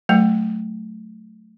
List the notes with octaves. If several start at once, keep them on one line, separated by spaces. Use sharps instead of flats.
F#3 A3 G5